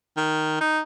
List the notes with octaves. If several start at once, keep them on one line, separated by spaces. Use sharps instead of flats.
D#3
D#4